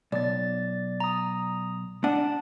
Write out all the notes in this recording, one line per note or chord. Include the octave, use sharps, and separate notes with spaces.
B1 D5 A6
A#5 D#6
D4 F#5 A5